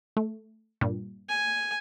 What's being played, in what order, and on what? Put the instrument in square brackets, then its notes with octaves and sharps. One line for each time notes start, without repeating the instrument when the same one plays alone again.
[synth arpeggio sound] A3
G2 A#2
[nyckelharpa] G#5